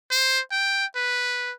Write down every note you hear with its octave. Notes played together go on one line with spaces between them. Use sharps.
C5
G5
B4